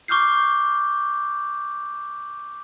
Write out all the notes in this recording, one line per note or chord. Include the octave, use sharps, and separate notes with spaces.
C#6 D6 F6 G6 C7